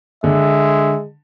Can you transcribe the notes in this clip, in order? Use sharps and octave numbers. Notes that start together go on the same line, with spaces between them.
D3 G#3 E5